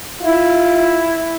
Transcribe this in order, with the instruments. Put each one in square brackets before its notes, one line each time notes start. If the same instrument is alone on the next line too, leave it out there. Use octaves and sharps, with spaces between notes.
[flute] E4 [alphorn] F4